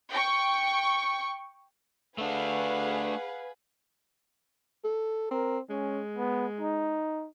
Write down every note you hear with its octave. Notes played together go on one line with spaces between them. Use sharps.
G5 C#6
A3 D4 G#4 B4 F5 F#5
A4
C4 A#4
G#3 C#4
B3
D#4